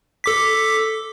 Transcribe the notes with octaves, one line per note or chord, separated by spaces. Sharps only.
A4 D6 B6